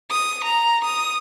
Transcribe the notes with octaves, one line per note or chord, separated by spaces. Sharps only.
D#6
A#5
D#6